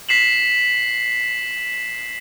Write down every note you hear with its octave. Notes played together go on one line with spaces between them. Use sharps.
B6 C7 E7 F#7